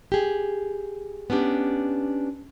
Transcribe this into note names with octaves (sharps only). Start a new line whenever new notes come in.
G4 G#4
B3 C#4 D4 G4